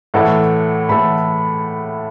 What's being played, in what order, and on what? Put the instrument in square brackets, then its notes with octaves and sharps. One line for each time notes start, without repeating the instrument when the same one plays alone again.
[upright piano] A2 E3 A3 E4 A4 [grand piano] F#5
[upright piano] A2 E3 A3 E4 A4 [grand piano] B5